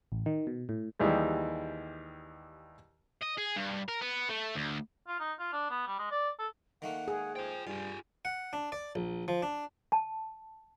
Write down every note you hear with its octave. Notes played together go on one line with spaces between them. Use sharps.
A1
D#3
B2
A2
D#2 E3 G3 G#3
D#5
G#4
G2
A#4
B3
A3
D2
F4
D#4
F4
D4
B3
G3
G#3
D5
A4
D#3 A3 A#3 F#5
G#4
F4 C5 G5
G2 F4 G4 G#5
F#5
D4
D5
A#1
F3
D4
A5